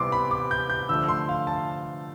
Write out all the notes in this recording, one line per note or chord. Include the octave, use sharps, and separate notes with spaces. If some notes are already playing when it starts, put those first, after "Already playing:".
Already playing: C3 E3 G3 B3 C6 D6
B5
D6
G6
G6
D3 F3 A3 E6
C6
F5
A5